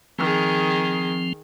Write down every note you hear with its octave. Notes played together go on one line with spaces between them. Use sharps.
D#3 F3 C4 G#4